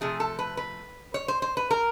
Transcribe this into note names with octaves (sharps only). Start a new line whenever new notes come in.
C3 F3 A3 G#4
A4
B4
B4
C#5
C5
C5
B4
A#4